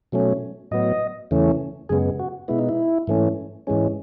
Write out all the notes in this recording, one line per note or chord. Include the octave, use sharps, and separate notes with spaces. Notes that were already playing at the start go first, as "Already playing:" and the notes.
B2 F#3 A3 C#4
A2 F#3 B3 D#5
E2 C#3 E3 A3 C#4
F#2 C#3 G#3 B3 G#4
F#4
B2 G#3 B3 E4
D#4
E4
G#2 E3 A3 C#4
G#2 E3 G#3 C#4